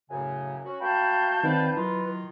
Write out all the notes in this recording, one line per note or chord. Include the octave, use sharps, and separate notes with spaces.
F#2 A2 C#3 G#5
C#4 F#4
A3 A#3 F#4 F5 G5 A5 B5 G6
D#3 C4 D#4 F#4 G4 B4 D5
D#3 F#3 E4 F4 A#5